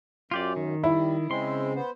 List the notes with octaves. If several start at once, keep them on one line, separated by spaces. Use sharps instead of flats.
F#2 F4 G4 D5
D#3
G3 E4
C#3 G#3 C4 C6
B3 C5